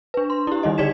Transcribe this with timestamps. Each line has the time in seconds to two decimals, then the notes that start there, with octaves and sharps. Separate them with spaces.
0.14 D4 B4
0.30 C6
0.47 E4 G4
0.63 D#3 G3 D#4 D#5
0.78 D3 D#4 D5 G#6 B6 E7